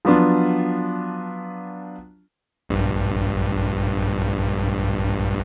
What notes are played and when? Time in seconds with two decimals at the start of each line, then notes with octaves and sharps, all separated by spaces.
0.05 F3 F#3 B3 D4 F4
2.69 A#1 G2